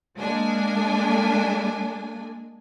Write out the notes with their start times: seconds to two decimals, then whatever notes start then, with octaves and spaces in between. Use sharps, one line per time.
0.18 G#3 A#3 D4 G#5